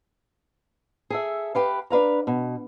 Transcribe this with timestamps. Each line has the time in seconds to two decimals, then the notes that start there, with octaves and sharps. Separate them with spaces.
1.10 G#4 A4 E5
1.55 G4 B4 F5
1.90 D4 B4 F5 A#5
2.27 B2